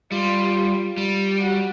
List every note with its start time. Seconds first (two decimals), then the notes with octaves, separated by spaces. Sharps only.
0.12 G3 F4
0.97 G3
1.40 F#4